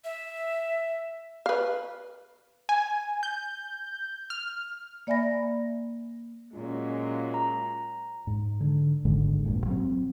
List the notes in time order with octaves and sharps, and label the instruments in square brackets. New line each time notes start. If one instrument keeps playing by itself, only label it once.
[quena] E5
[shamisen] B4 F5
[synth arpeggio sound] G#5
G6
F6
[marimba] A#3 D5 E5 G#5 B5 A#6
[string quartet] A#2 F#3 [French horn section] G#3 C#4 F4
[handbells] A#5
[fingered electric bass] G#2
D3
G#1 G#2 D3 G#3
F1 A#1 G2 A#2
F#3 C4